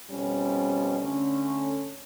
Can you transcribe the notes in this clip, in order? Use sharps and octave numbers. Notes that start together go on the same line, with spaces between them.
F2 B2 G3 C#4
D3 A3 C#4